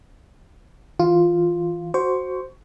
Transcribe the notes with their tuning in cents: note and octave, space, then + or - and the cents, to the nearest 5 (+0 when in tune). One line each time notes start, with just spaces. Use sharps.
E3 -15 F4 +0
F#4 +0 C5 +0 C#6 +20